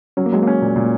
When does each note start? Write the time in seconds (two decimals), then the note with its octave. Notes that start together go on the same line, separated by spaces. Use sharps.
0.17 F#3 C#4
0.26 A#3
0.32 F#3 G#3
0.42 A#3
0.47 C#4
0.62 A#2
0.76 A#2